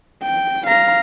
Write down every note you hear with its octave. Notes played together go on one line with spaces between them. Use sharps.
G5
F5 A#5